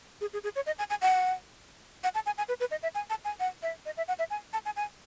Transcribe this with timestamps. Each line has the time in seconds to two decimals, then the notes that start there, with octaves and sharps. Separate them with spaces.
0.21 G#4
0.33 G#4
0.44 G#4
0.56 C#5
0.66 D#5
0.79 G#5
0.90 G#5
1.02 F#5
2.04 F#5
2.15 A5
2.26 G#5
2.38 G#5
2.49 B4
2.60 B4
2.71 D#5
2.83 E5
2.95 G#5
3.10 A5
3.25 G#5
3.40 F#5
3.63 E5
3.86 D#5
3.97 E5
4.08 F#5
4.19 E5
4.30 G#5
4.53 A5
4.66 G#5
4.76 G#5